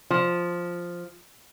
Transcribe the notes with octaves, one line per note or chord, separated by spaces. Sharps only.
F3